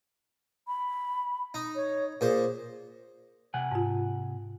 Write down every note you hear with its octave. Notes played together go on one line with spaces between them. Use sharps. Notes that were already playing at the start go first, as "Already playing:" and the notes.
B5
D#4
C#5
A#2 G#4 C5
C3 F#5 G#5
G#2 F4